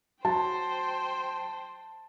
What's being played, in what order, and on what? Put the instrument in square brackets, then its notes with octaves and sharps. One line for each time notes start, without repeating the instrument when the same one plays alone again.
[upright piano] F#3 [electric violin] C5 G5 [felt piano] A5